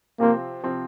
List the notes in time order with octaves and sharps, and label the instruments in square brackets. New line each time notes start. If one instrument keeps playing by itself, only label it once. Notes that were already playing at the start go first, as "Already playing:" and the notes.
[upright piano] C3 F3 C4 F4 C5 [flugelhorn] A#3
[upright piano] C3 F3 C4 F4 C5